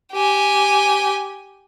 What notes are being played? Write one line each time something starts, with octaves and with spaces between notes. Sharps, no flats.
G4 G#5